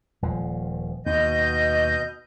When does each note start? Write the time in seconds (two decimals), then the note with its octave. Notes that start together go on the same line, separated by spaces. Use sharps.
0.22 D#1 F3
1.06 D#2 B2 D#5 G6